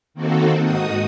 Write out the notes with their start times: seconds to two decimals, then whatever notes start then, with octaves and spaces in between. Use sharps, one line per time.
0.14 D#3 A#3 C4 F#4 A4
0.63 G#2 D#4 F#4 D#6